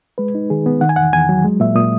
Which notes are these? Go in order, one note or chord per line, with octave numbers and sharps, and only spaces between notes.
G#3 B4
D#4
D#3 G#4
B3
D#3 F#5
G#5
E2 F#5
E2 G#5
F#3
G#3
A#2 E5
A#2 D#6